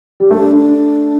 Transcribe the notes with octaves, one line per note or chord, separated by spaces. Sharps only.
G3
A3 D4
D4